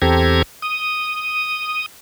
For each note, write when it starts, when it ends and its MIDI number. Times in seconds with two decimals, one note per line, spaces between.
0.02 0.42 40
0.02 0.42 60
0.02 0.42 67
0.02 0.42 69
0.02 0.42 82
0.02 0.42 92
0.62 1.86 87